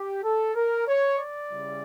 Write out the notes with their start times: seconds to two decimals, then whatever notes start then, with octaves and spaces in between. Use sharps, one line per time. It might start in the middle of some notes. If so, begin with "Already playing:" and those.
Already playing: G4
0.24 A4
0.55 A#4
0.88 C#5
1.18 D5
1.50 C#3 G3 C#4 E4